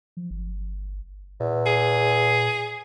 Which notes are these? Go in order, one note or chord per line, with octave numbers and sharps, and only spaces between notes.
F3
G1
E2 A#2
G#4